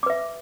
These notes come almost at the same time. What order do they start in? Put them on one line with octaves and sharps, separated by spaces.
D6 B4 E5